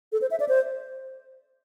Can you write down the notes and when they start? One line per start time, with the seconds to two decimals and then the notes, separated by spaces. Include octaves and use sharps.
0.12 A4
0.21 C5
0.31 E5
0.40 D5
0.49 C5